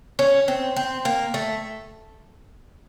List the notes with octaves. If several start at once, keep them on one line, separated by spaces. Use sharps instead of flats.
C#4
C4
C4
A#3
A3